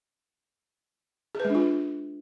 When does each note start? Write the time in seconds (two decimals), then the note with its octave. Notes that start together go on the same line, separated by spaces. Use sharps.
1.35 G#4
1.40 B4
1.45 G#3
1.50 D4
1.55 F4